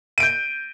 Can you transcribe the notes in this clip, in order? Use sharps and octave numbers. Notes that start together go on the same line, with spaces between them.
G6 D7 D#7